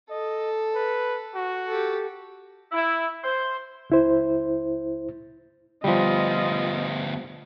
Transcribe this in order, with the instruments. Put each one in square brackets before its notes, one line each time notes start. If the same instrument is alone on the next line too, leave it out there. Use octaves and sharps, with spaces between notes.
[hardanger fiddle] A4 [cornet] D#5
[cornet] B4
F#4
[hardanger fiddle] G4 A4
[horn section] E4
C5
[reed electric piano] C#2 E4 C5
[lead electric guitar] D2 B3 [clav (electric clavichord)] F3 G3 [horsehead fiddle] F4 D#5